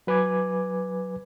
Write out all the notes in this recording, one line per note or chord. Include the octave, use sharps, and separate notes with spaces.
F#3 B4 G#5 D6 G#6